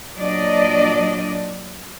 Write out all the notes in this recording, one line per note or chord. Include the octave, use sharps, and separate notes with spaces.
A#2 F#3 D4 D5 D#5